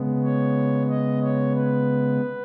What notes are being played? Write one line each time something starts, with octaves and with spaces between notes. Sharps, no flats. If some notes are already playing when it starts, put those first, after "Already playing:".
Already playing: C#3 G#3 B3
C#5
D#5
C#5
B4